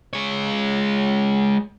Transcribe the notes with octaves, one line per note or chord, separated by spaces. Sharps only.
G#3 C#5